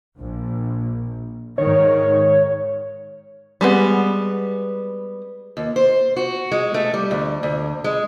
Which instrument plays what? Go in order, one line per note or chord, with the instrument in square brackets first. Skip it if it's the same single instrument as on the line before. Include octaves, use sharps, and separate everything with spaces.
[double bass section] A#1
[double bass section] G#2 D#3 [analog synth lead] C#5
[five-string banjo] G3 G#3 B3
[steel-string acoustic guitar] D#2
C5
F#4
G#3
A3
G3
D2
D2
G#3